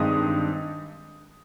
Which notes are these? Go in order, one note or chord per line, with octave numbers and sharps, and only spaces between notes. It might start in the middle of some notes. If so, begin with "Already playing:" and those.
Already playing: G2 D#3 G#3 C4 D#6